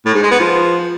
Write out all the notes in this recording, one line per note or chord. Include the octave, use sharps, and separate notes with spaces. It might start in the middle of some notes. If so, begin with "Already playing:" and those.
A2
G#2
G#3
B3
F3